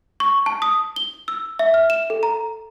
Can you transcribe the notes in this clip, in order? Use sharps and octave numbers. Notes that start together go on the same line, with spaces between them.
C#6
A5
D#6
G7
E6
E5
F6
E7
A4
A#5